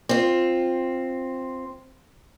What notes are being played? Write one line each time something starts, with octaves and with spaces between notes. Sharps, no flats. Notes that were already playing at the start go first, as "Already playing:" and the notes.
C4 F4